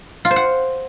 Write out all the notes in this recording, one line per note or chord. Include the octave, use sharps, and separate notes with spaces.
F4
C5
F#5